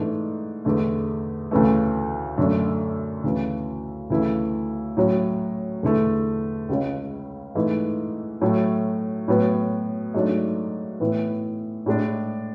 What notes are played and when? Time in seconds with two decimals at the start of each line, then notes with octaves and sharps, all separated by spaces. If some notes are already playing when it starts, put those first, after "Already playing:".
Already playing: G#2 E3 A3 D4
0.65 E2 D3 A3
1.51 D2 C#3 E3 A3
2.38 F#2 D3 A3 D4
3.24 D2 C#3 E3
4.10 D2 C#3 E3 A3 E4
4.97 A2 F#3 C#4
5.83 E2 D3 A3 E4
6.69 C#2 C#3 G#3 C#4
7.55 G#2 E3 A3 E4
8.41 A2 F#3 A3
9.28 A2 F#3 B3
10.14 G#2 F#3 A3 D4
11.00 A2 E3 B3 E4
11.86 A2 G#3 D4